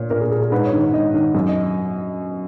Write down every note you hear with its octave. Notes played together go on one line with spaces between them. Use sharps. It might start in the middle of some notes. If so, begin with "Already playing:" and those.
Already playing: A#2 C#5
A#2 A#4
G#4
G#4
G#4
G#2 B4
C#5
D#3
C#5
G#2 D#5
D#3
F#2
D#5